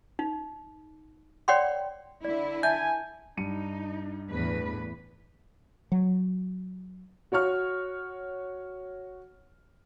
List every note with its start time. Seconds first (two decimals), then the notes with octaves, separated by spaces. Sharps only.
0.19 D#4
1.48 C#5 D5 F#5 G5 B5 C6
2.25 D3 E4 D5
2.63 E5 G#5 A5 G6
3.37 G2 D#4 C#7 D#7
4.31 E2 A2 B4
5.92 F#3
7.32 F#4 C#5 C#6 F6